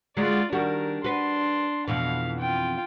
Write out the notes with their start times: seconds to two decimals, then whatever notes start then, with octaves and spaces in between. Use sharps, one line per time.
0.17 D3 F#3 G#3 F4 D5
0.52 D#3 G3 D4 F#4 A#4
1.04 D4 F#4 B4 C6
1.88 F2 B2 E3 F5
2.40 F4 G5